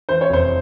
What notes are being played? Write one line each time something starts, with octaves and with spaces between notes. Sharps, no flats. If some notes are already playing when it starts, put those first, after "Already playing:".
E3 C5
C#5
F1 C5